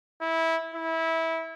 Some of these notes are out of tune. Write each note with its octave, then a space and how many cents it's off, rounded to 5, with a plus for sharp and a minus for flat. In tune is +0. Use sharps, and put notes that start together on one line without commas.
E4 -15
E4 -20